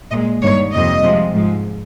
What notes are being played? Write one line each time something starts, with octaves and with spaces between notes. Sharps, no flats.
A#2 D#5
G#3
G2 D#3 G3 A#3 C#5
F2 C3 G3 A#3 D#5
C3 F3 G#3
G#2 F3 G#3